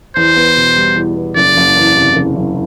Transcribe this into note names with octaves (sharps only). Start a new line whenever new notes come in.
E2 C5
B3
B2
G3
E2
B3
F#1 D5
F#1
E2
C3
F#1
F#1